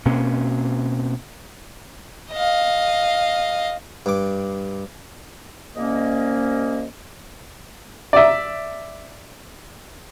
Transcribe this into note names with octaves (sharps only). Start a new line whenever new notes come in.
B2 A#3 C4 C#4
D#5 F5
G2 D6
C2 A#3 C#4 D#5
D5 E5